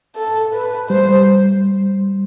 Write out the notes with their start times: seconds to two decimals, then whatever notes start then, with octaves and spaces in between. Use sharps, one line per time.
0.16 A4
0.53 B4
0.90 G3 C5